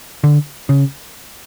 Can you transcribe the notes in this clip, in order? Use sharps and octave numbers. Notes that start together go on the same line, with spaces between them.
D3
C#3